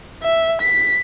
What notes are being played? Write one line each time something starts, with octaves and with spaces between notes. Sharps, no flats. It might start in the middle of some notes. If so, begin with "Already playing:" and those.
E5
B6